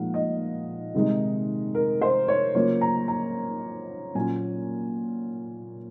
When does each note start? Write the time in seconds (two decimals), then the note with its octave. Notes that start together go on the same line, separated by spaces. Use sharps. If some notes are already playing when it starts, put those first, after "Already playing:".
Already playing: A#2 F3 G#3 D#4 F5 F#5
0.14 D#5
0.94 C3 D#3 G#3 D#4
1.75 A#4
2.02 C5
2.28 C#5
2.55 C#3 F#3 A#3 F4 C#5
2.81 A#5
3.08 A#5
4.15 A#2 F#3 C#4 F4 G#5